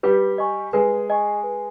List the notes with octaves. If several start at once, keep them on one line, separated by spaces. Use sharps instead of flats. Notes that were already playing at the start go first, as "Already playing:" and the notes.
G3 G4 B4
D#5 G#5 C#6
G#3 G#4 B4
D#5 G#5 C#6
B4